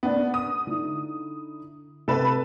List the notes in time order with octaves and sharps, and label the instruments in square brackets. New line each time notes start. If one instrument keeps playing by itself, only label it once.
[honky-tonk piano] B3 D4
D#6
[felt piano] D3 D#4 E4
[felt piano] C3 E7 [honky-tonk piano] A4 B4